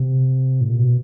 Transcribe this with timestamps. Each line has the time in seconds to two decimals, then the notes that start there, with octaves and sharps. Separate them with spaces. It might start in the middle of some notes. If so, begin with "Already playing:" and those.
Already playing: C3
0.61 A2
0.69 A#2
0.78 B2